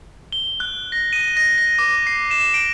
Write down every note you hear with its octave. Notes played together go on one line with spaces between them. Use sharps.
G7
F#6
A#6
D#7
A#6
A#6
D6
C7
E7
D7